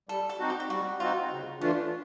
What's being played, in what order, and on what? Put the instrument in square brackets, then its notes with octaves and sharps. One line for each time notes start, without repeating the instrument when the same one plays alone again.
[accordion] G3 [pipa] A4
[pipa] A4
[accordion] C4 D#4 F#4
[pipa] G4
G4
[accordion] G3 [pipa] F#4
[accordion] C4 D#4 F#4 [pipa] F4
[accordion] C#3
[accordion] E3 A3 D4 F4 [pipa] C#4